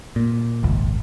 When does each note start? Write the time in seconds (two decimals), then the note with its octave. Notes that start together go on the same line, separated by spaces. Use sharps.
0.16 A#2
0.63 D#1 G#1 C#2